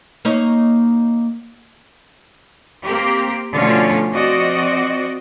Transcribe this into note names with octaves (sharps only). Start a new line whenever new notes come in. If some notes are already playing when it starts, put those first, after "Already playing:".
A#3 D#4 C#5
A#3 C4 G4
B2 D3 F3 A3 C#4 F4
F3 C4 F#4 D5 D#5